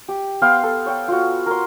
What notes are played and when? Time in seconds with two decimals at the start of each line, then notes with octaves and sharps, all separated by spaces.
0.08 G4
0.42 B3 F5 G5 C6
0.63 A4
0.86 C#5 G5
1.08 F4 F#4
1.46 A#4 C6